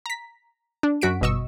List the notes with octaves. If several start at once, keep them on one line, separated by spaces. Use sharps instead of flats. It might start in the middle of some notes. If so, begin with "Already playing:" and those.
A#5 B6
D4
F#2 F#4 B6 D7
G1 B2 D#5 C#6 E6